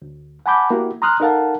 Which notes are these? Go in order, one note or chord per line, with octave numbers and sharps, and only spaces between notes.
D2
F#5 G#5 A5 B5 D6 G6
A#3 E4 F#4 G4
A#5 C6 D#6 F6 F#6
D#4 A4 A#4 F5 F#5 A5